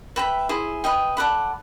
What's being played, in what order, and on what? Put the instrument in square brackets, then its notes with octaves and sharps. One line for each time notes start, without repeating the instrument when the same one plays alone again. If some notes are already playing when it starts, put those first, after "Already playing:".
[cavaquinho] B4 E5 G5 B5
E4 G#4 C5
B4 D#5 G5
A4 D5 F#5 B5